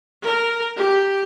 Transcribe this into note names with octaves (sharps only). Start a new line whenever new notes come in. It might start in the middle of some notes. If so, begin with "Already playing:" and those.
A#4
G4